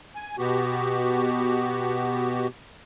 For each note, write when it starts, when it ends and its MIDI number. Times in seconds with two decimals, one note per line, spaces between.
0.16 0.36 80
0.38 2.47 47
0.38 2.47 59
0.38 2.47 66
0.38 2.47 67